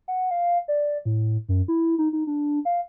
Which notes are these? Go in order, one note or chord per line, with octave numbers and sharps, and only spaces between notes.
F#5
F5
D5
A2
F#2
E4
D#4
D#4
D4
F5